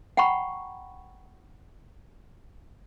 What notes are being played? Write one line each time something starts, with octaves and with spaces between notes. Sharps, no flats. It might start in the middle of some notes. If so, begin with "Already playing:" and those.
F#5 G5 A#5 B5 C#6